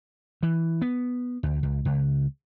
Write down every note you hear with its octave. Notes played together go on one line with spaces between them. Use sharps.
E3
B3
D2
C#2
C#2